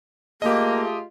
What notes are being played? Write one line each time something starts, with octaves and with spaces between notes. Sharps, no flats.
A3 A#3 F4 G4 G#4 D#5